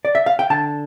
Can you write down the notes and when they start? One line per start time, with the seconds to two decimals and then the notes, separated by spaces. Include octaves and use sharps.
0.05 D5
0.15 E5
0.26 F5
0.39 G5
0.50 D3 A5